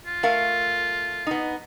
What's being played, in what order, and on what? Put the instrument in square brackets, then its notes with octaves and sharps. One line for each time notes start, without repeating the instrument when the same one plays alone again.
[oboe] F4
[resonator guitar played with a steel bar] A3 A#4 F5
B3 D#4